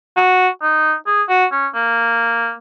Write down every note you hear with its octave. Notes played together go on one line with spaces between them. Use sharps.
F#4
D#4
G#4
F#4
C#4
A#3